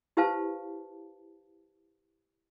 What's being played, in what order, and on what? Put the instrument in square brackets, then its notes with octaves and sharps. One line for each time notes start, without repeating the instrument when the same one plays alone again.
[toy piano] E4 G4 B4 C5 F5 A5